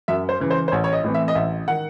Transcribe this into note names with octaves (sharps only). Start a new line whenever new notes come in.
F#2 E5
C5
C#3 E3
C5
C5
A1 C#5
C#5
D#5
A2 E3 C4
E5
D#5
A1 E5
D#3 F#5